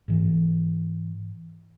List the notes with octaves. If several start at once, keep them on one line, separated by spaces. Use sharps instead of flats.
G#2 E3